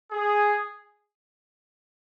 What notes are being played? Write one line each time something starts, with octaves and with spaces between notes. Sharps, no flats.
G#4